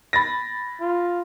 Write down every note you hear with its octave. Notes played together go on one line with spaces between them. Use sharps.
B5 A6 A#6
F4